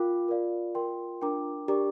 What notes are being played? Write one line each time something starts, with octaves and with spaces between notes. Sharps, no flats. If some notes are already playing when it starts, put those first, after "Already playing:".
Already playing: F4 A#4 G5 D6
A#4 D5 F5
A#4 G5 C6
D4 A#4 G5 A#5 D6
D4 G4 A#4 D5 A#5 D6